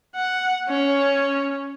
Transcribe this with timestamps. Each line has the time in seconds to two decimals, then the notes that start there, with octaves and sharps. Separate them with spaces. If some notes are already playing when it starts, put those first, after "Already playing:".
0.15 F#5
0.69 C#4